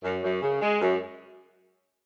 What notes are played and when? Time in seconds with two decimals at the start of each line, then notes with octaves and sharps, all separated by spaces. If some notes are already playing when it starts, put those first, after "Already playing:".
0.04 F#2
0.23 F#2
0.42 C#3
0.62 G#3
0.81 F#2